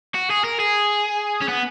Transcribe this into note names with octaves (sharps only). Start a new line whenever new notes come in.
F#4
G#4
A#4
G#4
C#4
B3